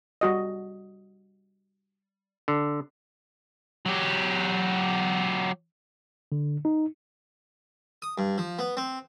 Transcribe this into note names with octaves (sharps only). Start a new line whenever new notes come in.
G3 F#4 D#5
D3
F#3 G4
D3
D#4
D#6
G2
F3
B3
C4